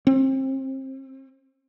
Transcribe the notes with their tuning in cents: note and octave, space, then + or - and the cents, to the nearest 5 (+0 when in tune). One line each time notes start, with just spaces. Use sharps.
C4 +30